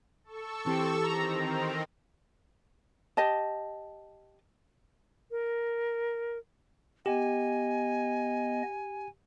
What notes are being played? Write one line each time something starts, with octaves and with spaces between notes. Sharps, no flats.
A4 C#6 E6
E3 C4 G4
D#3 C4 A#5
G4 D#5 A5
A#4
B3 G4 D#5 G#5